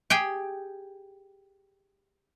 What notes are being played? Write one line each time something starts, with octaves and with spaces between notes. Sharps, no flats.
G4 G#4 G5